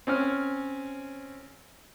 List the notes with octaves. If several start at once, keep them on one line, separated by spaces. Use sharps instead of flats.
C4 C#4 C#5 F6